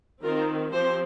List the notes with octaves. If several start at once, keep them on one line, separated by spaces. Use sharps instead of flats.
D#3 C4 F4 A#4
F3 C4 G4 C5